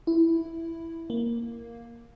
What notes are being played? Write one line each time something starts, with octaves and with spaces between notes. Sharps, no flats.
E4
A#3